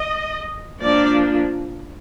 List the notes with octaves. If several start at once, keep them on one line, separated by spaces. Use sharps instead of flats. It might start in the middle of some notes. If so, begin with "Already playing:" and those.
Already playing: D#5
F3 A#3 D4 D5